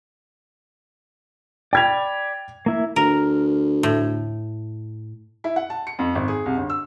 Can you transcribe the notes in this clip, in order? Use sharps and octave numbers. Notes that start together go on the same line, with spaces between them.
D5 G5 B5 G#6 F7
A#3 E4 E5
D2 A#4
A2
E4
F#5
A5
C#7
F2
G#1
G#4
C2
G1
E6